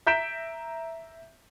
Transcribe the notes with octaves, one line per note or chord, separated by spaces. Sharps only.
E5 A#5 G6 B6 D7 E7